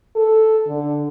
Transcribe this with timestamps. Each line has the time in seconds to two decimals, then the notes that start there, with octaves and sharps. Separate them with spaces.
0.16 A4
0.67 D3